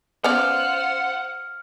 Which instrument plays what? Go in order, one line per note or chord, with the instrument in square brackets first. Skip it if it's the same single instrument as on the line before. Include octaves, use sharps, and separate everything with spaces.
[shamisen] B3 C#4 D5 [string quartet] F4 C5 [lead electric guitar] F#5 [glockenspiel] F6